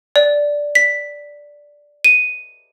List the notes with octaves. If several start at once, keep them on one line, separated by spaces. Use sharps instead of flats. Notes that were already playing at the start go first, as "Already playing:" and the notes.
D5
B6
D#7